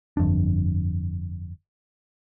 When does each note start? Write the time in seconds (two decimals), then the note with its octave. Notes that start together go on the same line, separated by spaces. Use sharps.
0.17 G1 F2 D4